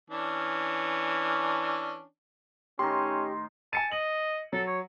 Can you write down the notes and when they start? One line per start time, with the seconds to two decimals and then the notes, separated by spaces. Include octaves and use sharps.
0.10 E3 C#4 D4
2.79 A2 D#3 C#4 D#4 G4 C6
3.73 G#5 A5 C#7 D#7
3.92 D#5 F#7
4.53 F#3 A4
4.67 C#5